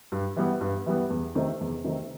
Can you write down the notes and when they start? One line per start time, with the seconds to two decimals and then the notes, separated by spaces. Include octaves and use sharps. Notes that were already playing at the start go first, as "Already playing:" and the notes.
0.12 G2
0.37 E3 G3 B3
0.61 G2
0.86 E3 G3 B3
1.10 E2
1.35 C3 D#3 A3 C4
1.61 E2
1.85 C3 D#3 A3 C4